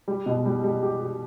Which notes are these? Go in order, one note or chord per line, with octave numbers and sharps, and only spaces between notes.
G3
B2
G3
G3
G4
G4